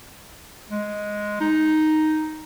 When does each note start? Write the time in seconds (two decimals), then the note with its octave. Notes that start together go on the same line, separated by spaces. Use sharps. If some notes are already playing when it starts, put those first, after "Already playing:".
0.70 G#3
1.41 D#4